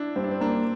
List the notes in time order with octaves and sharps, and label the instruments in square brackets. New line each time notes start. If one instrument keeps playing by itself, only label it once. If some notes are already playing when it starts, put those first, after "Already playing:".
Already playing: [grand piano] D4 E4
[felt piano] G2 [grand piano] C4
[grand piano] D4
C4
[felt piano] A#3 [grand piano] D4